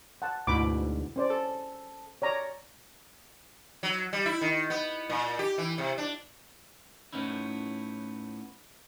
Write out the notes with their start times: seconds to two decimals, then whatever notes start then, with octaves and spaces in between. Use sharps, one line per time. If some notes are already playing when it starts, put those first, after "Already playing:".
0.22 F#5 A5
0.47 D2 G#2 B2 E4 B5 D6
1.16 C#4 C5 D5
1.30 A4
2.22 C#5 D5 A#5
3.83 F#3
4.13 G3
4.26 E4
4.41 D#3
4.70 B3
5.10 A#2
5.39 G4
5.58 E3
5.78 C3
5.98 D4
7.13 A2 B3 C#4 D#4 E4